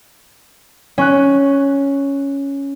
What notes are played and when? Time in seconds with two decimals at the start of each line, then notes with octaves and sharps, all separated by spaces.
0.98 C#4 F#6